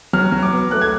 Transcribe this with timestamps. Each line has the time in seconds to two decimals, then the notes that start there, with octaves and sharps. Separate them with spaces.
0.13 F#3 F6
0.32 F#3
0.43 D6
0.52 B3
0.71 A3 F#6
0.81 G#6